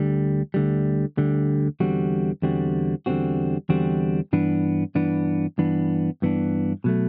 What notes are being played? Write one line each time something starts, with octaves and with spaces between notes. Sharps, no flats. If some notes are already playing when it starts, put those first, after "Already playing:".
Already playing: D2 D3 G3
D2 D3 G3
D2 D3 G3
E2 D3 G3 C4 F#4
E2 D3 G3 C4 F#4
E2 D3 G3 C4 F#4
E2 D3 G3 C4 F#4
G2 E3 B3 D4
G2 E3 B3 D4
G2 E3 B3 D4
G2 E3 B3 D4
B2 F#3 A3